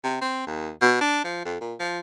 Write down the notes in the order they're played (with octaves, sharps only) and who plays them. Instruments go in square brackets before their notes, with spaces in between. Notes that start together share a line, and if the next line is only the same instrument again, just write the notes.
[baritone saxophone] C3
C4
D#2
B2
D4
F3
F2
A#2
F3